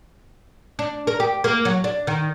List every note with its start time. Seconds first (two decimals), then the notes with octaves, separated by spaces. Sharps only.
0.79 D4
1.07 A#4
1.20 G4
1.44 A#3
1.65 F#3
1.84 D4
2.07 D#3